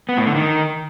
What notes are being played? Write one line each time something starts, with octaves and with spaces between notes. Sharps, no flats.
B3
A2
D3
D#3